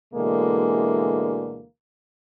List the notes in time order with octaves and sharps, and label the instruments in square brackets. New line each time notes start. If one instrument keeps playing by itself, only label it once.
[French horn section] D2 B2 D3 E3 G#3 A#3